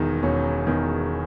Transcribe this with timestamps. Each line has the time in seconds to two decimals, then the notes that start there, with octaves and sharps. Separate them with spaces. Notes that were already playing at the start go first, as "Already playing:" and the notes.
Already playing: E1 E2 D#3 D#4
0.23 E1 C#4
0.67 E2 D#3